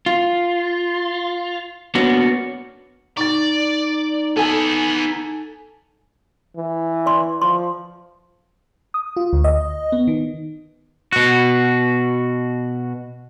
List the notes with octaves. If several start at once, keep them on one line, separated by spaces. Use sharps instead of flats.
F4
A#3 B3 C#4 D4 F#4
D#4 D5 C#6 A6
B3 G#4 A4 G#5
E3
D5 C6
F3 C6
D#6
F4
D2
D#5
B3
D#3
B2 F#4